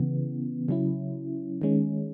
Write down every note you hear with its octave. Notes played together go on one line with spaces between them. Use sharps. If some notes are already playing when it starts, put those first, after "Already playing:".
Already playing: C#3 E3 B3
C#3 F#3 C#4 E4
D#3 G#3 C#4